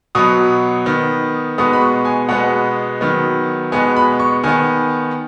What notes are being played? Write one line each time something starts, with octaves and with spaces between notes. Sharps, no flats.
B2 F#3 B3 D#6
D#3 B3
B2 G#3 B3 D#6
B5
C#6
G#5
B2 G#3 B3 F#5
D#3 F#3 B3
B2 G#3 B3 G#5
B5
C#6
D#3 B3 G#5